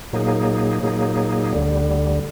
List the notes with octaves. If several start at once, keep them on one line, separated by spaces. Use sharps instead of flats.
A#2 F#3 A#3 D#4 G#4
A#2 F#3 A#3 D#4 G#4
D2 D3 G3